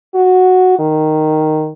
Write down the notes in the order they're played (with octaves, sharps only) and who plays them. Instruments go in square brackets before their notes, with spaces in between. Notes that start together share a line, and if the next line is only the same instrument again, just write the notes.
[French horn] F#4
D#3